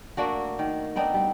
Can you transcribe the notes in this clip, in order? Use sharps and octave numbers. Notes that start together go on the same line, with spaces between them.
A3 A#3 D4 F#4
D#3
B3 C4 D4 D#4
G3